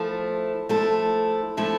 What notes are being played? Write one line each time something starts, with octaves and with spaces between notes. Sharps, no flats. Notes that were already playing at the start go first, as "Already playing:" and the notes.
Already playing: F3 A3 E4 A4
F3 A3 E4 A4
F3 A3 E4 A4